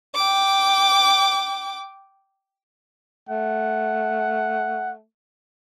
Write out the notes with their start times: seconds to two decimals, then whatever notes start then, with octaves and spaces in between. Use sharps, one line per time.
0.15 G5 D6
3.29 A3 F#5